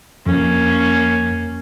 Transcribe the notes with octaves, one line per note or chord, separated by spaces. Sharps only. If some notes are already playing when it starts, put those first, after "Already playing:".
F2 A#3 C#4